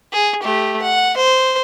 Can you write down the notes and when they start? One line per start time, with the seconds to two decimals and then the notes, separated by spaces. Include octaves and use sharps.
0.13 G#4
0.43 A3 G4
0.82 F#5
1.17 C5